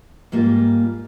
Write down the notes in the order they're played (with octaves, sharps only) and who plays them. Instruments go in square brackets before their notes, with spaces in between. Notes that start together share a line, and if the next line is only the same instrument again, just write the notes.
[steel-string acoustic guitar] G#2 G3 A#3 F4